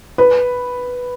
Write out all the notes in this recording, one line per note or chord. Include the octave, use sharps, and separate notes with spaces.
B4